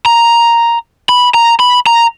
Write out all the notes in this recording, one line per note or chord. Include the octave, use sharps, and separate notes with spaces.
A#5
B5
A#5
B5
A#5